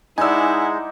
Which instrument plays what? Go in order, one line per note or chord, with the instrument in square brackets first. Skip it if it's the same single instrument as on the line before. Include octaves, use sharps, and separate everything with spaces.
[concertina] G#3 [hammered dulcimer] D#4 D5 [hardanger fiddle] E4 F#5 [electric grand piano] G#5 E6